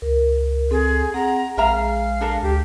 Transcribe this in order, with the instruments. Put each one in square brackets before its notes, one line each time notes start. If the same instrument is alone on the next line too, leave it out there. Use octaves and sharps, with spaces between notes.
[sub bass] C#2 [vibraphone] A#4
[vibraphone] C4 A4 [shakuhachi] G#4
[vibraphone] C4 G#4 F#5 [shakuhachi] A#5
[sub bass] A#1 [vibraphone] G#3 G#4 [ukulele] A#4 E5 A#5 [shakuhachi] F5
[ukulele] D4 A4 A#4
[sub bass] D2 [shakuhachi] G4